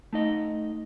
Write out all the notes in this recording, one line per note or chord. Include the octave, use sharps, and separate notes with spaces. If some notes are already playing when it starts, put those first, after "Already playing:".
A3 D#4 D#5